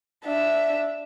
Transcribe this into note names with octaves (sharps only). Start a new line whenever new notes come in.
D4 E5